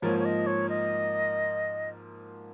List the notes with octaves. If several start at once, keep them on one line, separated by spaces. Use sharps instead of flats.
G#2 F3 A#3 F4 C#5
C#5
D#5
C#5
D#5